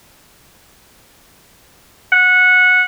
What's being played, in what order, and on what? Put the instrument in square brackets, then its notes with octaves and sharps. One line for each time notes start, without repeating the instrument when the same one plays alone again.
[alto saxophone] F#5